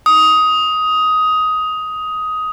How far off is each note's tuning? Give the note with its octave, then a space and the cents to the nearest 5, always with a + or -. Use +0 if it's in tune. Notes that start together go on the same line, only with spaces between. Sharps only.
D#6 +15